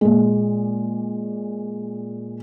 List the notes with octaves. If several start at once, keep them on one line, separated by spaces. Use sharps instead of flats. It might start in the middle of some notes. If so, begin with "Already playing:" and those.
A#2 G#3